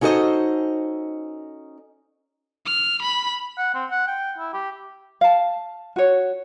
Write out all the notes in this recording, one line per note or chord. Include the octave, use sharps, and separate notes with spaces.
C#4 D#4 F#4 A4 C5 D#5
F6
B5
F#5
C4
F#5
G5
E4
G4
F5 A5
F#4 C#5